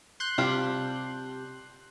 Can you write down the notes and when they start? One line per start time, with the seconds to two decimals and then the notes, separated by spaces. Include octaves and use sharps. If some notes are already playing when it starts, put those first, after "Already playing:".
0.20 C6 F#6 G6
0.38 C3 G3 D4 F4